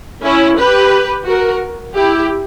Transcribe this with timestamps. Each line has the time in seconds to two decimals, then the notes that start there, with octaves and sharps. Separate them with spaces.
0.23 C#4 E4
0.58 G4 B4
1.26 F#4 A#4
1.95 E4 G4